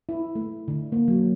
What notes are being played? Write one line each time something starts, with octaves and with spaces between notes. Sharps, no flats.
E4
A3
D3
A#3
F#3